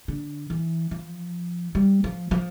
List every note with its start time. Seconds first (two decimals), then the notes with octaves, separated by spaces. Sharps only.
0.08 D3
0.50 E3
0.91 F3
1.75 G3
2.04 F3
2.31 F3